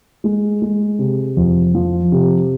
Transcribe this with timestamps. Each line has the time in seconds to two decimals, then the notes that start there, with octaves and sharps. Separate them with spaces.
0.24 G#3
0.62 G#3
0.99 C3
1.37 F2
1.75 F3
2.12 C3